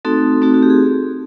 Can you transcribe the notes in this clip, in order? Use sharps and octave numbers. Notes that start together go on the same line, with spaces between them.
A3 C4 D#4 F#4 A4
A3 C4 D#4 F#4
F#4
G4
G#4